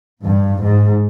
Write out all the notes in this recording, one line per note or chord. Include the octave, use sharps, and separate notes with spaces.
G2
G#2